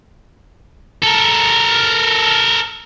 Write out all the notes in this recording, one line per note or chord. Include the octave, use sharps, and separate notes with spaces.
A4 A#4